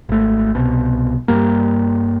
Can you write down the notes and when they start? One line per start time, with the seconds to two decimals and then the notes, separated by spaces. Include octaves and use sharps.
0.09 G#1 A3
0.55 C2 B2
1.28 G2 G3 A#3